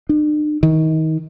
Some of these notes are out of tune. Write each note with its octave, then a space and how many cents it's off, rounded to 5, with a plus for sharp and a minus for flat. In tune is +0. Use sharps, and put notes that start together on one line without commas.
D4 +45
D#3 +30